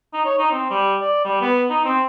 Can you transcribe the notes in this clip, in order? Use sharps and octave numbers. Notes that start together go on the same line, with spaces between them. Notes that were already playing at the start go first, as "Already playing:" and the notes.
D#4
C#5
D#4
C4
G3
D5
G3
B3
D#4
C4